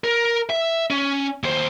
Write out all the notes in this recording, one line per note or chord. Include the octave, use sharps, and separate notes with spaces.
A#4
E5
C#4
D#2 C5